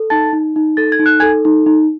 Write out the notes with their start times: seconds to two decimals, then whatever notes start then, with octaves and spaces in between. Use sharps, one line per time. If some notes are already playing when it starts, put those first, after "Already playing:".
Already playing: A4
0.10 D#4 A5 A6
0.33 D#4
0.56 D#4
0.77 A4 A6
0.92 G#6
0.99 D#4
1.06 F#6
1.20 A4 G#5 G#6
1.45 D#4
1.66 D#4